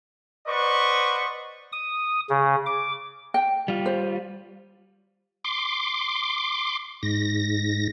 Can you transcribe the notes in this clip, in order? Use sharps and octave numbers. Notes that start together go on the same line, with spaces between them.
B4 C5 D5 D#5 F#5 C#6
D#6
C#3
D6
G5
G3 F4
C5
C6 D6
G#2 A#6